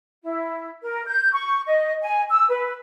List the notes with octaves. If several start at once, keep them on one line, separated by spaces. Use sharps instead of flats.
E4
A#4
G6
C#6
D#5
G#5
E6
B4